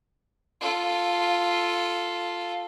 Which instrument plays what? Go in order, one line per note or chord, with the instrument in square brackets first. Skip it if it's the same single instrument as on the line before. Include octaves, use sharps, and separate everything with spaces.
[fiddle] F4 A4